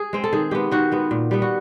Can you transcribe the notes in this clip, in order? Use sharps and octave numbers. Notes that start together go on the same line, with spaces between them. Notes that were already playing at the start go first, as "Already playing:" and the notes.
Already playing: G#4
G#3 C4
A4
D#3 G#4
G#3 B3 G4
D#3 F#4
G#3 B3
A#2
G3 B3
F#4